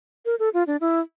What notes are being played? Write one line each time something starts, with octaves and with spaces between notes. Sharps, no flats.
A#4
A4
F4
D4
E4